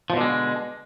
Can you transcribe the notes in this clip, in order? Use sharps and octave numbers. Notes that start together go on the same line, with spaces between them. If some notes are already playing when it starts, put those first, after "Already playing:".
B2 D3 F3 G#3